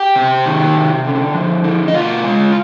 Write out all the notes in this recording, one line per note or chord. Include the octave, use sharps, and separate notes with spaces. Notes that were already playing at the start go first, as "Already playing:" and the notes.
Already playing: G4 G5
C3
D#3
C3
D3
F3
D3
D#5
B2 F4 F5
G#3